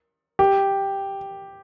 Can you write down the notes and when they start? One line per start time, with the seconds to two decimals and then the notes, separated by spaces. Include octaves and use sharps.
0.39 G4